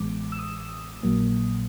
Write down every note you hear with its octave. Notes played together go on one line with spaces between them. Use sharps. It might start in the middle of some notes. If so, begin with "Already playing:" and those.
Already playing: A1 A2 E3 G#3 B3 D6
E6
D#6
A#1 A#2 F#3 A#3